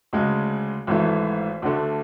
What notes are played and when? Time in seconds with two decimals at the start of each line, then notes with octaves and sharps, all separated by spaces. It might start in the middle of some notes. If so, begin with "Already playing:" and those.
0.13 D2 C#3 G#3
0.87 G#1 G#2 E3 A3
1.62 D2 D3 A3